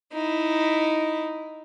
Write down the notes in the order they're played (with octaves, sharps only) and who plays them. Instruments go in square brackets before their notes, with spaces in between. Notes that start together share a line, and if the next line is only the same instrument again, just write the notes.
[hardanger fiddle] D#4 E4